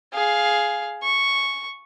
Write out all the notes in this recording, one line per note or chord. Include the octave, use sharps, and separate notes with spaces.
G#4 F5
C#6